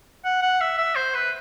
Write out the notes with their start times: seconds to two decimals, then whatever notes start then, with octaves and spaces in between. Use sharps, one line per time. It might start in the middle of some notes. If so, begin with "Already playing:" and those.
0.25 F#5
0.42 F#5
0.61 E5
0.78 E5
0.95 C5
1.14 B4